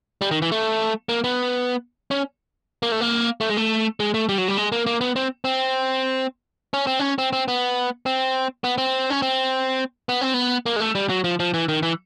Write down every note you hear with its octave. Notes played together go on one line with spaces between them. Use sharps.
G3
D#3
E3
A3
A#3
B3
C#4
A#3
A3
A#3
A3
G#3
A3
G#3
A3
G3
F#3
G3
G#3
A#3
A#3
B3
C4
C4
C#4
C4
C#4
C4
C4
B3
C4
B3
C4
C#4
C4
B3
C4
B3
A#3
G#3
A3
G3
F#3
F3
F3
E3
D#3
E3